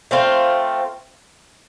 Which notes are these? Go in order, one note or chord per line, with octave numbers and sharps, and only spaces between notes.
A3 C4 F4 C5